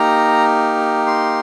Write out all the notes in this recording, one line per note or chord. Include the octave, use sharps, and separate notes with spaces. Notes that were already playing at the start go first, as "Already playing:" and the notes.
Already playing: A#3 D#4 G4 A#5
C6